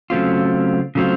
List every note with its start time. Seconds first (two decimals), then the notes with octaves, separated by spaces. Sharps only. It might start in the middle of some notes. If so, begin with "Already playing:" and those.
0.10 C#3 F#3 A3 C4 F4
0.95 C#3 F#3 A3 C4 F4